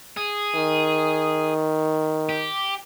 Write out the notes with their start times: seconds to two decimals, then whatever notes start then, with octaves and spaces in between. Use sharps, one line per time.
0.17 G#4
0.55 D#3
2.29 G4